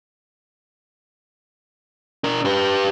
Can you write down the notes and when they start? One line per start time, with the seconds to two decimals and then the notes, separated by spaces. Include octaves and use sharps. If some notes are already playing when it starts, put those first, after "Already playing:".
2.24 D4 A#4
2.45 G4 B4